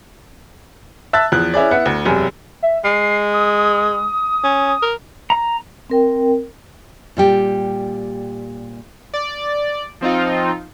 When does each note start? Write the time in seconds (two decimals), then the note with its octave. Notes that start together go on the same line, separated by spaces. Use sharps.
1.13 E5 A5 E6 F#6 A6
1.32 E2 F3 F#6
1.54 C#4 E4 G#4 D5
1.71 B3 E4 F#5
1.86 D2
2.05 E1 F#2 C3 G#5
2.63 E5
2.84 G#3 C7
3.33 D#6
4.43 C#4
4.82 A#4
5.30 A#5
5.90 C4 A#4 G5
7.17 A#2 G3 G4
9.14 D5
10.01 F3 C4 D#4 F4